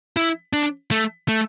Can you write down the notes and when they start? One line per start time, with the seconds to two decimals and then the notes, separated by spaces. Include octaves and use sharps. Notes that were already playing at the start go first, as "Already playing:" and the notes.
0.17 E4
0.53 D4
0.91 A3
1.28 A3